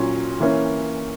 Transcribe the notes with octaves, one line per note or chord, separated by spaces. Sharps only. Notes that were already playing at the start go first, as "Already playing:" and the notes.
Already playing: A#2 F#3 C#4
E3 A#3 C#4